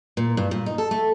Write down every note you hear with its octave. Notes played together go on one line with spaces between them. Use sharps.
A#2
G2
A#2
D#4
A4
A3